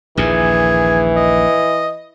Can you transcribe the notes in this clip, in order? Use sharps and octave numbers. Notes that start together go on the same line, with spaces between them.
A#1 D#2 A#2 E3 G#4
D#5